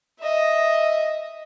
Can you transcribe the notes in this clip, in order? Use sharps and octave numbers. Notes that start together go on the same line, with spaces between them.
D#5 E5